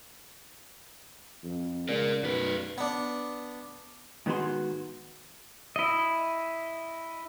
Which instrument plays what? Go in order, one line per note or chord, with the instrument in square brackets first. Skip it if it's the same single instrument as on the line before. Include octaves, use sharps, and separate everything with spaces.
[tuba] F2
[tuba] C#2 [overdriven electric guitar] A#4 D5
[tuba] B1 [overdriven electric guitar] F#2 B4
[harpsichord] B3 D4
[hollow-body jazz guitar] G#2 D#3 B3 F#4 G#4 C6
[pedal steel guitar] E4 D#5